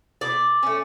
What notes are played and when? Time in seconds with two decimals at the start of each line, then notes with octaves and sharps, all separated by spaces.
0.21 B2 D5
0.63 A3 C#4